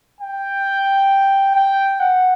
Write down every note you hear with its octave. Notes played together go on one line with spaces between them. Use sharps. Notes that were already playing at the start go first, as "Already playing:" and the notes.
G5
G5
F#5